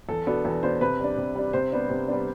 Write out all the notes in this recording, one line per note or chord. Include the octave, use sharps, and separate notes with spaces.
E2 A4
B2 B3 D4 A4
E2 A4
B2 B3 D4 C5
C3 B4
G3 D4
C3
G3 D4
C3 C5
G3 B3 D4
C3
G3 B3 D4